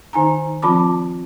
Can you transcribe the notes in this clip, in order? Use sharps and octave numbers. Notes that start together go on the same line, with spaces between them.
D#3 D#4 G#5 A#5
F3 C4 F4 A5 B5 D6